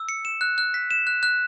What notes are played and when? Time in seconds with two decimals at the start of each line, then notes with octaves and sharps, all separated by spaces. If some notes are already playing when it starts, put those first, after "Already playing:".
Already playing: E6
0.09 C#7
0.25 E7
0.41 F#6
0.58 F#6
0.74 B6
0.91 E7
1.07 F#6
1.23 F#6